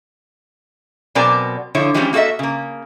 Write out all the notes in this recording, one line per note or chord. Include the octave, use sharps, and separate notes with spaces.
B2 F#3 C4 A#4 D5 G#5
D3 F3 E4 C#5
E3 F3 G3 G#3 C4 C#4
A#3 F#4 A4 D#5 E5
C#3 A#3